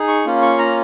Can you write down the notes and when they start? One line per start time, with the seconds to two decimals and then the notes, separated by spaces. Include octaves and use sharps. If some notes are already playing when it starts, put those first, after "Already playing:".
Already playing: D#4 G#4
0.08 C#6
0.26 A#3 C#4 F4
0.42 C#6
0.58 A#5